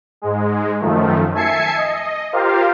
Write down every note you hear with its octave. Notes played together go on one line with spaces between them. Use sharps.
G#2 G#3
F#2 D#3 F3 A3
E5 G#5 A5 G#6 C7 C#7
D#5
F4 G4 A#4 C5 F5